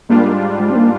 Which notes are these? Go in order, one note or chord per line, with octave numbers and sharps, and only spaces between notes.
G#2 G3 A#3 D4 F4
G#3
C4
A#3